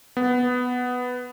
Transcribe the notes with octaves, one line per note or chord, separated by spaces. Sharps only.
B3